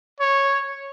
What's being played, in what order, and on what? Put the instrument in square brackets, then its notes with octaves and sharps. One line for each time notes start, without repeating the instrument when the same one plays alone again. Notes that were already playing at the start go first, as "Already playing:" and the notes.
[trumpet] C#5